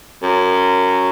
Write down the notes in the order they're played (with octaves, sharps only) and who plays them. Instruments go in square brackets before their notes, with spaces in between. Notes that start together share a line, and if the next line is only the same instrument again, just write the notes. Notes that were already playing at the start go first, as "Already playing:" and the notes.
[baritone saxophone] F#2